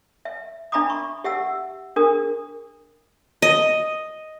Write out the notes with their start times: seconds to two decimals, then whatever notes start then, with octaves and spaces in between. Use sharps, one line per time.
0.25 E5
0.72 D4 E5 A#5 B5 D6 D#6
0.90 C#6
1.24 G4 E5 F#5 E6
1.96 D4 G#4 A#4 D#6
3.42 D#5